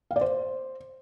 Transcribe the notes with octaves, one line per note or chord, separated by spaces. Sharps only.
F5
D5
C5